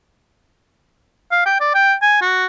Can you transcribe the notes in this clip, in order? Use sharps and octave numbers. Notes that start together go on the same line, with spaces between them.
F5
G5
D5
G5
G#5
F#4